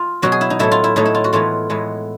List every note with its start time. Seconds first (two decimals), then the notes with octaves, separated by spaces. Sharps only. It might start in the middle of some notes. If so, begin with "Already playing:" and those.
Already playing: F4
0.22 B2 F#3 B3 F#4
0.32 G#4
0.41 E4
0.50 D#4
0.59 A2 F#3 A3 E4
0.71 F4
0.84 E4
0.96 A2 F#3 A3 D#4
1.05 E4
1.15 F4
1.24 F#4
1.33 A2 E3 G#3 B3 F4
1.70 A2 E3 G#3 B3